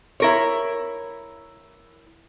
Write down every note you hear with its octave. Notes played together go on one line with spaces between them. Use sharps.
E4 A#4 C#5